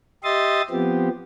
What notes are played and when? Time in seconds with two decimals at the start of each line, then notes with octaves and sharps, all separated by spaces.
0.24 G4 D#5 E5 C6 D#6 A6
0.71 F3 B3 C4 G4